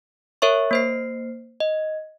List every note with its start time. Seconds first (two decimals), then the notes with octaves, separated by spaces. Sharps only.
0.42 A#4 C#5 E5 C#6
0.71 A#3 C5 C7
1.60 D#5